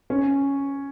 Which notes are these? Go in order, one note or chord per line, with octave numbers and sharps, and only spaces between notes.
C#4